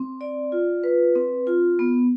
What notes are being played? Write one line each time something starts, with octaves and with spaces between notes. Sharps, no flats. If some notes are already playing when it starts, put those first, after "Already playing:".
Already playing: C4
D5
F4
B4
C4
F4
B3